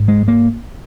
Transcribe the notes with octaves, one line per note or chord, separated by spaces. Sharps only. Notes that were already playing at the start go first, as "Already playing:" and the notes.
Already playing: G#2
G#3
A#3